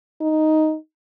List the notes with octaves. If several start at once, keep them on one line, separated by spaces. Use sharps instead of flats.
D#4